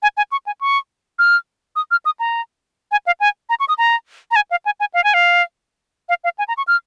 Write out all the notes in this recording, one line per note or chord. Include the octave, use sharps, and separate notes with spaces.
G#5
G#5
C#6
G#5
C#6
F6
D#6
F6
D#6
A#5
G#5
F5
G#5
A#5
C#6
D#6
A#5
A#5
G#5
F5
G#5
G#5
F5
G#5
F5
F5
F5
G#5
A#5
C#6
F6